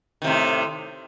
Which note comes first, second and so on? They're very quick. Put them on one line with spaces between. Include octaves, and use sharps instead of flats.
D#3 C3 A2